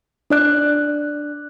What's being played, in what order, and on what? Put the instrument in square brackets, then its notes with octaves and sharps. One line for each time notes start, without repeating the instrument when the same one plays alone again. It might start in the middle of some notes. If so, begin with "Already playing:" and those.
[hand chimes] D4 D5 F#6